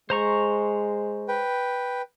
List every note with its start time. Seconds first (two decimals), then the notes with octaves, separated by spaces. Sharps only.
0.10 G#3 C5 A#5 C#6
1.28 B4 G5